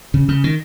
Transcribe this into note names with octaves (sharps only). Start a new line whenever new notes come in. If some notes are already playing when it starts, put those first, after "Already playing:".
C#3
C#3
D#3